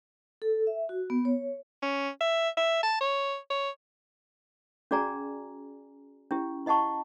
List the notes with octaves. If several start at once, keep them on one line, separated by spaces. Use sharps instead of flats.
A4
E5
F#4
B3
C#5
C#4
E5
E5
A5
C#5
C#5
C#4 F#4 G#4 D5 G#5 A#5
C#4 E4 G4
E4 D#5 F#5 A5 C#6